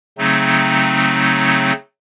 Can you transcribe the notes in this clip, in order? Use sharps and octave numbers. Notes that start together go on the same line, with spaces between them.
C#3 F#3 A3 C4 D#4